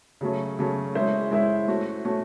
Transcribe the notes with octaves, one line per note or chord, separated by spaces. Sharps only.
C#3 F#3 A3 C#4
C#3 F#3 A3 C#4
G#3 C#4 E4 C5 E5
G#3 C#4 E4 C5 E5
A3 C#4 F#4
A3 C#4 F#4